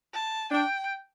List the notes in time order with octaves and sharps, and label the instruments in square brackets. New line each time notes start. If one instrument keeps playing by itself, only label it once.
[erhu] A5
[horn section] D4 [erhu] G5